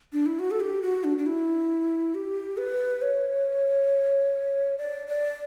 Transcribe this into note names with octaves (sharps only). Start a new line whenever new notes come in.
D4
E4
F#4
A4
G4
F#4
D4
D4
E4
G4
B4
C#5
D5
D5